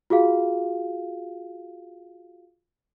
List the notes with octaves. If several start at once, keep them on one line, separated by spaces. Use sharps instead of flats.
F4 F#4 G#4 F5